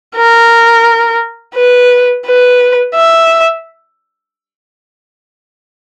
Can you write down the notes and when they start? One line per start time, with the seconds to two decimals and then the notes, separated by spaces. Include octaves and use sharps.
0.16 A#4
1.55 B4
2.26 B4
2.94 E5